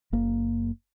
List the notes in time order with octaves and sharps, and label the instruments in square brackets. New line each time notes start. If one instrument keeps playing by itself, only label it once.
[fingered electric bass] F#1 A#3